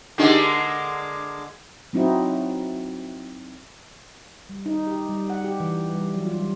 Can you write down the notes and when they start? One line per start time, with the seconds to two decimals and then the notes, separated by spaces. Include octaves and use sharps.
0.18 D3 G#3 A#3 D4 D#4 G4
1.93 F#3 C4 D#4 E4 F#4
4.49 G3
4.66 D#4
4.87 G4
5.09 G3
5.30 F#5
5.44 G4
5.60 E3
5.92 G3
6.14 F#3
6.26 F4
6.40 G3